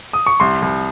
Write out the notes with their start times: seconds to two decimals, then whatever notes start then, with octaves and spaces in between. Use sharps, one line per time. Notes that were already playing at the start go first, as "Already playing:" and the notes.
0.13 D#6
0.26 C#6
0.40 C2 C6
0.62 C2